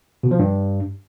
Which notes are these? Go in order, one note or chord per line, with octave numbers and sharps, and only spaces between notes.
B2
F3
G2